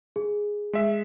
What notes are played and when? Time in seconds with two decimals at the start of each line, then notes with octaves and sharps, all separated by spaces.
0.16 G#4
0.73 G#3 E5